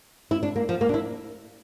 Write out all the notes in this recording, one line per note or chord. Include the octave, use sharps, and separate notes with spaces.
E4
D4
A#3
F3
A#3
D4
E4